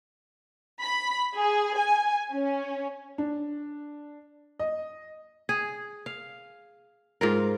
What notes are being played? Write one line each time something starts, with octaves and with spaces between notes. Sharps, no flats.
B5
G#4
G#5
C#4
D4
D#5
G#4
F5
G#2 F4 A#4